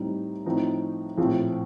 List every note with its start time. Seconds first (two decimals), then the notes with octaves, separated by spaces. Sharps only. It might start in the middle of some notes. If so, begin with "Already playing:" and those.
Already playing: A2 G3 C4 D#4
0.46 A2 F3 C4 D#4
1.18 A#1 A2 F3 C4